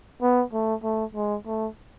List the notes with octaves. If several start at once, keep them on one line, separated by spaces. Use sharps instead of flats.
B3
A3
A3
G#3
A3